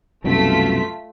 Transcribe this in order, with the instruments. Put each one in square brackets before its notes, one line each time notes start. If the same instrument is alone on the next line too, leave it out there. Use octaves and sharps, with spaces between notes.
[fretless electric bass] C2 F#2 B2 [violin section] A3 F4 B6